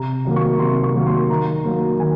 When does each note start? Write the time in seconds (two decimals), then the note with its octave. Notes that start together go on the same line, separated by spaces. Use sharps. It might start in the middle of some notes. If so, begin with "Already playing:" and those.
Already playing: C3 A#5
0.25 D#3 F#3 A#3
0.36 C#6
0.60 C3 C6
0.84 C#6
0.94 D#3 F#3 A#3
1.07 C6
1.30 D#3 A#5
1.65 F#3 A#3
1.99 D#3 G#5